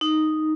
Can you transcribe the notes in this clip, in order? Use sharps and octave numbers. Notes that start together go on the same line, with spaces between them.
D#4